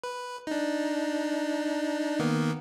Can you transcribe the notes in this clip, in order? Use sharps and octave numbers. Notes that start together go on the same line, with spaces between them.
B4
D4 D#4
D#3 A#3 B3